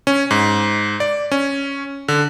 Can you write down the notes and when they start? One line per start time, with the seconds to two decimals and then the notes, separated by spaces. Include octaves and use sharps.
0.07 C#4
0.31 G#2
1.00 D5
1.32 C#4
2.08 D3